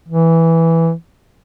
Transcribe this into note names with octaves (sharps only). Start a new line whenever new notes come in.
E3